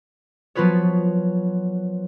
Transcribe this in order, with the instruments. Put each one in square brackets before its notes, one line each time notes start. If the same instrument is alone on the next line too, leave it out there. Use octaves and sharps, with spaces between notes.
[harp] F3 F#3 B3 F4 B4 C#5